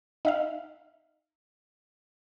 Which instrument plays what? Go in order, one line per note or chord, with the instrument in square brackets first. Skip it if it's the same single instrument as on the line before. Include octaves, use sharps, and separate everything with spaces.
[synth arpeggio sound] D#4 E5 F5